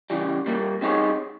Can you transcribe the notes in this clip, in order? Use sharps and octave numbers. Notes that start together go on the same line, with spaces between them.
C#3 E3 G3
A#2 G3 A#3
G3 C4 D#4 G#4 C#5